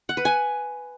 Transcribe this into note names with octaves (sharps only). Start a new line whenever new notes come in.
F#5
B4
G#5